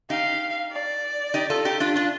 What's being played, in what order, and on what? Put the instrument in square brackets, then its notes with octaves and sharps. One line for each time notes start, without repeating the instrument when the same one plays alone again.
[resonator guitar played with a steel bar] D#4 G4 [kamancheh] F5
[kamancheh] D5
[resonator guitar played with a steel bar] D#4 G4
F4 A4
D#4 G4
D4 F4
D4 F4